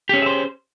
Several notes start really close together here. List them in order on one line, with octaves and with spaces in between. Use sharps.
G4 C#4 G#4 E5 C5